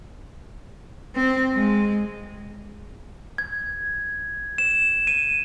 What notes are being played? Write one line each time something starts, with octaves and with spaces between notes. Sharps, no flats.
C4
G#3
G#6
E7
D#7